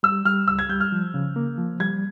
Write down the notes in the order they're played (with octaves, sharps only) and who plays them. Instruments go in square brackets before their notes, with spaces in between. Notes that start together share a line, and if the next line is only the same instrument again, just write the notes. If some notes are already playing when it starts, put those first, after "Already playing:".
[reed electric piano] G3 [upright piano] E6
[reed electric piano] G3 [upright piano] F6
[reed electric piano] C#2 [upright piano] E6
[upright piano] G#6
[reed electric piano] G3 [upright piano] G6
[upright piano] F6
[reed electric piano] F3
C#3
A#3
F3
[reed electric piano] G3 [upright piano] G#6